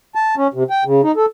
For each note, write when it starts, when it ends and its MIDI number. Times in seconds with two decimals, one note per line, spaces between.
0.15 0.35 81
0.37 0.47 61
0.54 0.64 48
0.70 0.84 79
0.85 1.01 49
1.03 1.12 63
1.16 1.26 69